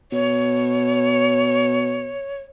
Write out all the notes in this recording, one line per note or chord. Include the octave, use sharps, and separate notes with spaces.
B2 C#5